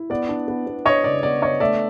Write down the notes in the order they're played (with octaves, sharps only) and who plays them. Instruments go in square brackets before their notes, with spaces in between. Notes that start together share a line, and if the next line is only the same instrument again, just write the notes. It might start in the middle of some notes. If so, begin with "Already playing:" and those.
Already playing: [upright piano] E4
[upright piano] B3 [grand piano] D5
[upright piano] D4
B3
B3
[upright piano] D4 [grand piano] C#5 D#5
[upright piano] C#3 [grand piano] D5
[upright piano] B3 [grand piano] D5
[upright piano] D4 [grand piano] C#5 D#5
[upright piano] A3 [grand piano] D5 E5